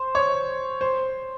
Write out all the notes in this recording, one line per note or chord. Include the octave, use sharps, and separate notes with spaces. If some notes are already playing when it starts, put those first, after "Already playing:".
Already playing: C5
C#5
C5